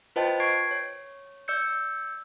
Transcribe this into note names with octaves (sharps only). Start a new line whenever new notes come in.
F4 B4 C5 D#5 G5 A5
C#6 G#6 C7 D7
C#5
D5 E6 G6 C#7